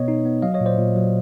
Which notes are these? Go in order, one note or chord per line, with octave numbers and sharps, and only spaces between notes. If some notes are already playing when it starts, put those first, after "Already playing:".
Already playing: B2 B3 C#5 D#5
D#4
B3
F#3 D#5 F5
C#5 D#5
A#2
C5 D5
A#2
F#3